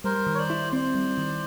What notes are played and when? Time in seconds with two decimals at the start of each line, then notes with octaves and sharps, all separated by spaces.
0.04 G3 A#4 C5
0.27 D#3
0.34 C#5
0.38 C5 D5
0.50 E4
0.73 C4 C5 D5
0.95 G3
1.18 D#3